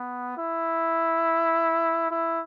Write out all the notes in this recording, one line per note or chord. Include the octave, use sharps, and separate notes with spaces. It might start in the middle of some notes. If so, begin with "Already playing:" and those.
Already playing: B3
E4
E4